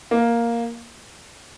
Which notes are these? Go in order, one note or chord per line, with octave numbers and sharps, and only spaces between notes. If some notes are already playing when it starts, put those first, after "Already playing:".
A#3